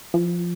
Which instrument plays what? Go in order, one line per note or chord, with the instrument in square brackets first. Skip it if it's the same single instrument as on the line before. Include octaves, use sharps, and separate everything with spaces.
[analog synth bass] F3